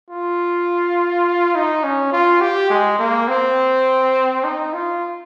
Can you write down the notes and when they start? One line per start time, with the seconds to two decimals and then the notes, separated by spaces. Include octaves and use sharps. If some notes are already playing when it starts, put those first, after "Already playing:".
0.10 F4
1.55 D#4
1.83 C#4
2.12 F4
2.41 G4
2.70 G#3
2.99 A#3
3.28 C4
4.44 D#4
4.73 F4